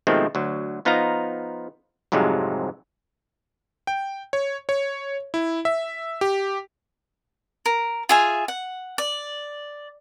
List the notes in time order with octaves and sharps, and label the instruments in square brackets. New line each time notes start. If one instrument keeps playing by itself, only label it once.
[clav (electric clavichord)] B2 D#3 F3 G#3 A3 C4
D2 F#3
F3 B3 D#4 F4 F5 A#5
C2 F2 G#2 C3 F#3 G#3
[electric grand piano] G5
C#5
C#5
E4
E5
G4
[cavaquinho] A#4
F4 G#4 E5 G#5
F#5
D5